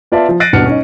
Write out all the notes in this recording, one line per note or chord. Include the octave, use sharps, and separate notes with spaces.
B3 F4 D5 E5 A5
F3
F#6 A6 A#6 C7 D7 D#7
D#1 B2 D4 F#5 F6 C#7
C#4 D#4